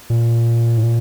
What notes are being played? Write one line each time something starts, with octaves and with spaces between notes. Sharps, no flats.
A#2
A2
A#2